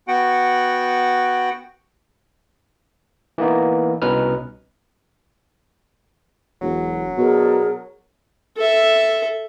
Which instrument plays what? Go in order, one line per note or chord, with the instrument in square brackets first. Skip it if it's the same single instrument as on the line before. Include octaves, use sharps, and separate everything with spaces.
[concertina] B3 F#4 F#5 G5
[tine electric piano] E3 A#3 B3 D#4
C2 B2 C#4 D#4 B4 F6
[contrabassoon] E1 [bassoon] F#3
[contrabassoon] B2 [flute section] D4 G#4 A#4
[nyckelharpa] A4 E5